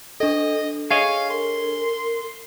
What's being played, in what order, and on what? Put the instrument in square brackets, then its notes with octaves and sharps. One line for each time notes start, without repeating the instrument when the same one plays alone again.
[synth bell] D4 A4 [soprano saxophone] D#5
[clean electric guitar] G#4 C#5 D#5 [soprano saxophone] F5
[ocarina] A#4 [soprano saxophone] C6